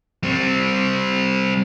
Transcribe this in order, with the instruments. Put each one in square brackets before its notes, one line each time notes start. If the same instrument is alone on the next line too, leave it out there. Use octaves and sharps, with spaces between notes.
[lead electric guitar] G3 C4